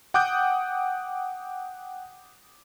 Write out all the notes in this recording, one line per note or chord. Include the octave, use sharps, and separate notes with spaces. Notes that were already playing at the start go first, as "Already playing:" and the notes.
F#5 G5 D6 D#6 F#6 G6